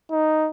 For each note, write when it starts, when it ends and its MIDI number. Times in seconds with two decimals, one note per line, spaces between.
0.11 0.49 63